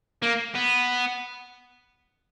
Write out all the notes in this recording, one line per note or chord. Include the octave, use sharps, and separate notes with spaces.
A#3
B3